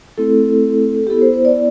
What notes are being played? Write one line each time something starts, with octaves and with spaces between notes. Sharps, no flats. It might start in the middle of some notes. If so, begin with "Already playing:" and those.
A3 C4 E4 A4
G4
B3 E4 A4
C5
C5
D5